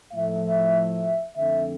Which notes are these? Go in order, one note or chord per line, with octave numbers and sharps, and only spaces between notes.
A2 F3 A3 E5
F2 D3 A3 C4 E5